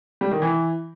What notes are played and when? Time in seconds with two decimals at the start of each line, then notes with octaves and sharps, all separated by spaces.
0.21 G3
0.31 D#3
0.42 E3